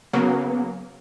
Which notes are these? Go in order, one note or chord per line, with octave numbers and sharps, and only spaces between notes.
C#3 F#3 A#3 B3